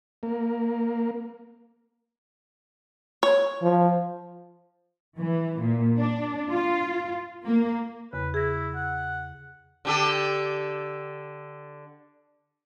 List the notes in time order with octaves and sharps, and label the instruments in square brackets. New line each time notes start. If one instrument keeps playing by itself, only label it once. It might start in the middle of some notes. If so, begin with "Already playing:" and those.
[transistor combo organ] A#3
[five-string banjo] C#5
[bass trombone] F3
[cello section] E3
A#2
D4
F4
A#3
[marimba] E2 C#3 [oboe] B4
[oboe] E4 [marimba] G#4 A#6
[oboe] F#5
[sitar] D3 G4 A4